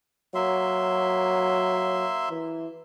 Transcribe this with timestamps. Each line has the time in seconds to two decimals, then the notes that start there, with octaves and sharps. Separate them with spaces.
0.35 F#3 A#3 E5 C6
2.30 E3